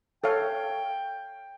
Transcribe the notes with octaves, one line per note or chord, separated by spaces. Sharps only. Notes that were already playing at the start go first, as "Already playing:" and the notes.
A4 C#5 F5 G5